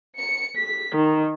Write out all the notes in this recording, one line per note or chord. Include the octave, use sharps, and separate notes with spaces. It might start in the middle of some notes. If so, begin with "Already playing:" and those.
C#7
B6
D#3